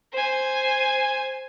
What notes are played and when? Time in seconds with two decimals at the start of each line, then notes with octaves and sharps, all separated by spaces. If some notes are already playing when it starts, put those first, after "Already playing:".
0.12 C5 G#5